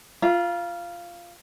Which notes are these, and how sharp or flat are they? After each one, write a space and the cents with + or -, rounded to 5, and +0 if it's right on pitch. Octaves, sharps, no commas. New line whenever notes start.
F4 -10 E5 +35 A#5 +45